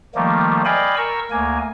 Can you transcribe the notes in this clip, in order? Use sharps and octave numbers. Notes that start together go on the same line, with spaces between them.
D#3 F3 G3 A3 A#3
D5 D#5 F5 G5 G#5 B5
A#4 C#6 E6
D2 A#3 G#5